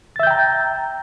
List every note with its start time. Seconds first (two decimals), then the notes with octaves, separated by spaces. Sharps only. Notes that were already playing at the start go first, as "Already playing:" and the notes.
0.16 A6
0.20 E5
0.23 G6
0.27 G5
0.31 A#5